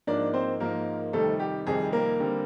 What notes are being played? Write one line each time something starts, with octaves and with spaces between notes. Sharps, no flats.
G#2 F3 A#3 D4 D#4 D5
C4 C5
G#2 F3 A#3 D#4 A#4
F2 C3 D#3 G3 A3 A4
G4
F2 C3 D#3 G3 G#4
A#3 A#4
D3 G3 C4